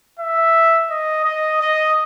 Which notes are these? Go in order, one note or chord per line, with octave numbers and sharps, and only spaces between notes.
E5
D#5
D#5
D#5